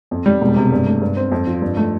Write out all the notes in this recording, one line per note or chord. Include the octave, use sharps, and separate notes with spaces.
F2
G3
E1
C3
G2
A3
G2
C4
F2
F3
G2
A3